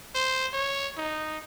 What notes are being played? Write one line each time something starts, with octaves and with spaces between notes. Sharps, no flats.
C5
C#5
D#4